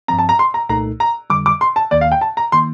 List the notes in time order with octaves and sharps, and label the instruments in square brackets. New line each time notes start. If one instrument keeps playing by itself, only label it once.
[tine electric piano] G2 F3 C4 [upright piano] A#5
[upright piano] A5
A#5
C6
A#5
[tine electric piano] C2 A#2 A3 D#4 A4 [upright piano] A#5
[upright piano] A#5
[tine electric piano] F2 D3 G3 [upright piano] D6
[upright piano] D6
C6
A5
[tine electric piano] D#2 D#3 A#3 [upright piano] D5
[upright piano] F5
G5
A5
A#5
[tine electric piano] D#3 A#3 [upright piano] C6